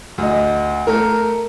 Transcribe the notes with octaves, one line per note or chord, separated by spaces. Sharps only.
D2 D#5
A3 A#4